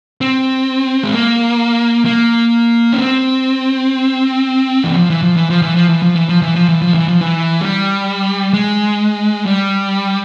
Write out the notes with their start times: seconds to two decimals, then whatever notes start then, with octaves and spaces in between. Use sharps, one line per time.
0.21 C4
1.03 G#3
1.13 A#3
2.06 A#3
2.92 C#4
2.99 C4
4.84 E3
4.96 F3
5.10 E3
5.23 F3
5.36 E3
5.50 F3
5.62 E3
5.76 F3
5.89 E3
6.02 F3
6.16 E3
6.29 F3
6.42 E3
6.55 F3
6.69 E3
6.82 F3
6.94 E3
7.08 F3
7.21 E3
7.61 G3
8.53 G#3
9.46 G3